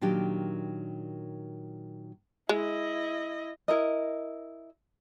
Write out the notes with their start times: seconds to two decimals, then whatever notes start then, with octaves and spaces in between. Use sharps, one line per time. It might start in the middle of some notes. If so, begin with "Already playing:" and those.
0.01 A#2 D#3 F#3 D4 G4
2.49 G#3 E4 D#5
3.68 E4 A#4 D#5